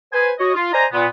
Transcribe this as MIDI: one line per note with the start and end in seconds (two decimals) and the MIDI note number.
0.13 0.31 71
0.13 0.31 72
0.13 0.31 80
0.39 0.51 66
0.39 0.51 73
0.39 0.51 75
0.54 0.69 65
0.73 0.85 72
0.73 0.85 74
0.73 0.85 75
0.73 0.85 80
0.73 0.85 82
0.93 1.05 46
0.93 1.05 59